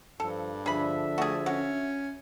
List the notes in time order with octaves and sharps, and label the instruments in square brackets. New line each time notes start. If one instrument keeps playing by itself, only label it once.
[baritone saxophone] G2 [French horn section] F3 [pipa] A4
[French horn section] D3 F3 D4 [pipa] G#4 B5 [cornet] E5
[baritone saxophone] A3 [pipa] F#4 G#4
[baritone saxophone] C#4 [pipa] F#4